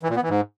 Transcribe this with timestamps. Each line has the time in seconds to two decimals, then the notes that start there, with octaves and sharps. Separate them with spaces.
0.03 E3
0.09 A#2
0.16 B3
0.23 E3
0.29 G#2